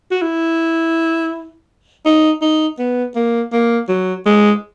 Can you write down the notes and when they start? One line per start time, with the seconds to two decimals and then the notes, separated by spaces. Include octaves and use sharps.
0.11 F#4
0.22 E4
2.05 D#4
2.42 D#4
2.78 B3
3.16 A#3
3.53 A#3
3.88 F#3
4.26 G#3